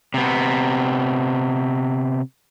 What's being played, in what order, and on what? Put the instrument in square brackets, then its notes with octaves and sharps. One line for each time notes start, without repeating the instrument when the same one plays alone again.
[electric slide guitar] C3 B3